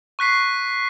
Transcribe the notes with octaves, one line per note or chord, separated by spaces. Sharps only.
C#6 F#6 B6 C7